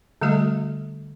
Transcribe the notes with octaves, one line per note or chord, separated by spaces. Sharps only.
D3 G3 A3 F#4 A4 D#5